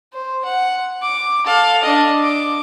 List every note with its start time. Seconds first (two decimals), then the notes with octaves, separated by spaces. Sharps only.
0.13 C5
0.45 F#5
1.02 D6
1.45 A4 F5
1.83 D4 D#5
2.23 D6